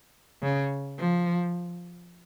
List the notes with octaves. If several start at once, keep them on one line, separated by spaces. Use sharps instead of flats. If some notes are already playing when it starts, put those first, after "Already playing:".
C#3
F3